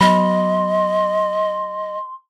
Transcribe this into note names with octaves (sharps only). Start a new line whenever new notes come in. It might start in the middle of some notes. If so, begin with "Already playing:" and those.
F#3 B3 D#5 B5 C6